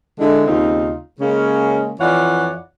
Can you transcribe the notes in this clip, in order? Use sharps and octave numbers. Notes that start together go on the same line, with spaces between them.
D3 G#3 E4
D#2 C#3 C4 D#4 F4
C#3 G#3 A#3 C#4
F2 E3 F4 C#5 D5 F#5